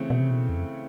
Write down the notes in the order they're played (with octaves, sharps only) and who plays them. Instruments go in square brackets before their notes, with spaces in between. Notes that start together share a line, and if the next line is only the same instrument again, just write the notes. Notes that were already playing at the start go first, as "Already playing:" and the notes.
Already playing: [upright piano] C#3 E3 A3 C4
[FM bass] B2
C3
B2
E2
F2